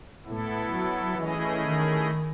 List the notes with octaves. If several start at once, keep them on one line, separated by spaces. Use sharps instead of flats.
A2 B3 E4 A4
F#3
E3 A3 C#4 E4 G#4 D#5
D#3